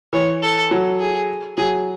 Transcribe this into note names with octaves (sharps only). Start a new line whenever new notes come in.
E3 C#5
A4
F#3
G#4
F#3 G#4